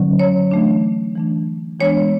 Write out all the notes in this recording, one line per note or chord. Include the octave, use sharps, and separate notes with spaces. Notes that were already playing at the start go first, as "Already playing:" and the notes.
Already playing: D3 F#3 C#4
C#5
E3 A3 D4
E3 A3 D4
E3 G#3 B3 D4 C#5